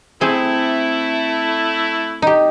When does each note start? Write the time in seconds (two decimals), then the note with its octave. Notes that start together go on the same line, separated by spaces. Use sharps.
0.21 A3 C4 E4 G#4
2.22 D#4 G4